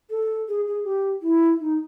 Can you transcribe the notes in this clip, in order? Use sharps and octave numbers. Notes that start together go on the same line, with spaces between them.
A4
G#4
G#4
G4
E4
D#4